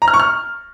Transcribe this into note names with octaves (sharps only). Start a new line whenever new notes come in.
A#5
F6
C#6
F6